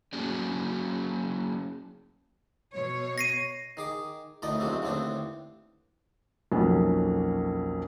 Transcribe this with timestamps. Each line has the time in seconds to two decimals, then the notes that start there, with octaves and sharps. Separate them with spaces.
0.13 F#3 A#3 C#4 G#4 D5
2.73 B2 C#5
3.18 A#6 C7 D#7
3.77 D#3 G#4 D6
4.42 D2 A2 D3 D#3 D5 D#5
4.60 F#2 A#2 D3 F#3 G#3 C4
4.82 D#2 A2 D3 B3 C4 D4
6.52 B1 F2 A#3 C#4